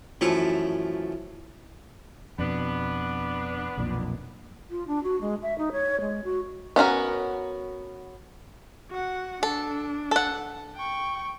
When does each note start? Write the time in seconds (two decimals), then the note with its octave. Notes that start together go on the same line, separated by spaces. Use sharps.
0.21 F#2 E3 F3 A3 C#6
2.38 F2 B2 B3 D4
3.77 B1 F2 A#2
4.71 F4
4.87 D4
5.04 F#4
5.21 G#3
5.42 E5
5.58 D#4
5.72 C#5
6.01 G#3
6.24 F#4
6.76 B3 C#4 F#4 A#4
8.90 F#4 F#5
9.43 D4 A4
10.11 A4 F#5
10.76 G5 C#6